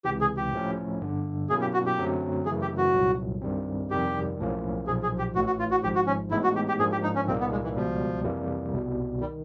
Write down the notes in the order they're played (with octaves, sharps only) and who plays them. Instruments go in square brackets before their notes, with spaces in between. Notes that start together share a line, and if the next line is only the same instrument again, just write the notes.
[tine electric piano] C#2 C3 E3 [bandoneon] G4
[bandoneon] G#4
G4
[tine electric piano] A2 F3 A3 C#4
G1 G2 D3
[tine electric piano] B2 F#3 A#3 C#4 E4 [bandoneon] G#4
[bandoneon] G4
F#4
G4
[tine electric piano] F#2 D3 F#3 A3 C4
[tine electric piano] F#2 C#3 E3 A3 [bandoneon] G#4
[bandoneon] G4
F#4
[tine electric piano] C2 A#2 F#3
G2 D#3 G3 C4
[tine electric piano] F2 C3 D#3 G3 [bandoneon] G4
[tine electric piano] B1 A2 F3 A#3 C#4
[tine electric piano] B1 A#2 F3 [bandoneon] G#4
[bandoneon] G#4
G4
[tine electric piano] A1 A2 E3 A3 [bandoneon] F#4
[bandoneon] F#4
F4
F#4
[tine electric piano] G#1 G#2 F3 [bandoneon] G4
[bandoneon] F#4
C#4
[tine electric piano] A2 E3 G#3 B3 D#4 [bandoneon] E4
[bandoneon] F#4
G4
G4
[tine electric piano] G#2 F3 A#3 D4 [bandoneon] G#4
[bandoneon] G4
D#4
C#4
[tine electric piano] C2 A#2 G3 A#3 D#4 [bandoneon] C4
[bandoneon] B3
G#3
E3
[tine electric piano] C#2 B2 G3 [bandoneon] F3
[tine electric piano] F2 C3 E3 G3 A#3
C2 B2 G3
[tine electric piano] D#3 [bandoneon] G3